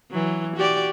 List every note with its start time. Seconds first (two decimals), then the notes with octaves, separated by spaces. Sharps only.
0.11 E3 F#3
0.56 F#4 G4 D5